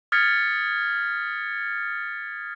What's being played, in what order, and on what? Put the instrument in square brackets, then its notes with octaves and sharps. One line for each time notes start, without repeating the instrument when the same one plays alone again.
[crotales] D#6 F6 G#6 A6 B6 C#7